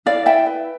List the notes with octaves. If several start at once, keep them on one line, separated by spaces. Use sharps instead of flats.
E4 D5 F5
E4 E5 G5
B4